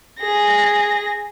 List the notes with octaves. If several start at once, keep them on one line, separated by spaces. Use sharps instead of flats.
G#4 A#6